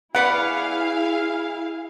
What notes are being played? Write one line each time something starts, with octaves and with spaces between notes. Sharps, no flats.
B3 E4 G#4 B4 D5 F5 F#5